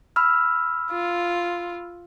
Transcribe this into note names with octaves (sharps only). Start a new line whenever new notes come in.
B5 E6 F6
F4